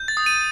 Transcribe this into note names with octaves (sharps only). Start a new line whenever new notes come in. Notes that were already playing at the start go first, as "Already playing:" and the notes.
Already playing: G6
A6
D#6
D#7